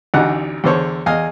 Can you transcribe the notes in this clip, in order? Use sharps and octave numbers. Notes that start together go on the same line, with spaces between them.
A1 D2 D4 D#4 F#5
E2 D3 A4 C5 C#5
E2 D#5 F5 G#5